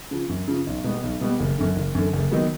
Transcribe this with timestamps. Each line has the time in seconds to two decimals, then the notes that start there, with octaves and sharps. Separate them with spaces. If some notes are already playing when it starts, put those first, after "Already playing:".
0.11 C#3 F3
0.29 F#2
0.48 C#3 F3
0.67 B1
0.84 B2 G3 B3
1.03 B1
1.21 B2 G3 B3
1.40 F#1
1.58 F#2 D3
1.76 F#1
1.95 F#2 D3
2.13 F#1
2.31 D#3 F#3 B3